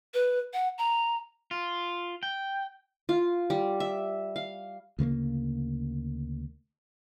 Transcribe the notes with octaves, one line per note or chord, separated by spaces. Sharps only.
B4
F#5
A#5
F4
G5
F4
G3
E5
F5
D2 C#3 A3 A#3